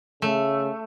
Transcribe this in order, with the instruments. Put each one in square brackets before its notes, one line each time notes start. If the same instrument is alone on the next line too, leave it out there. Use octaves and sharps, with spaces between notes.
[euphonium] C#3 [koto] A3